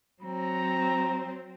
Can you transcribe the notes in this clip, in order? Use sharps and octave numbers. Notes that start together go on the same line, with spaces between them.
F#3 C4 A#5